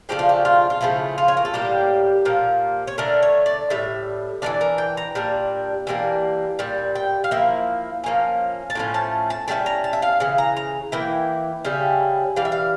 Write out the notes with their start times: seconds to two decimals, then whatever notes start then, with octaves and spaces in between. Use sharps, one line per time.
0.09 C#3 F3 A3 D4 G4
0.19 F4
0.29 G4
0.45 F4
0.70 F4
0.81 C#3 F3 A3 E4
1.18 F4
1.28 C#5
1.37 A#4
1.45 A4
1.53 A2 G3 A#3 G4
2.25 A#2 F3 A#3
2.87 C#5
2.98 D3 A3 D4 A#4
3.22 C#5
3.46 D5
3.70 A2 G3 E5
4.42 E3 G3 D4 D5
4.61 A#4
4.78 G5
4.97 A#5
5.15 A#2 G3 D4
5.87 E3 G3 A#3 D4
6.59 A#2 G3
6.95 G5
7.24 F5
7.31 F3 A#3 E4 E5
8.04 F3 A#3 C#4
8.70 A5
8.75 A2 F3 A3 C#4
8.94 A5
9.30 A5
9.48 D3 G3 C#4 E4 A5
9.66 A#5
9.84 A5
9.93 E5
10.02 F5
10.20 C#3 E3
10.38 A#5
10.57 A#5
10.92 E3 A#3 E4 G5
11.65 C#3 G3 C#4 E4
12.36 E3 G3 F5
12.45 E5
12.52 F5